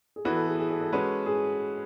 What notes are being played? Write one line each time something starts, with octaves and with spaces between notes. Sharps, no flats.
G#4
E3 B3 F#4 A4 B4
A4
G#4
G#4
A4
A4
G#3 C#4 F#4 B4
G#4